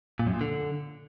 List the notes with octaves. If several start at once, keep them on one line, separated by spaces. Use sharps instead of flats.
A#2
F#2
A#2
D3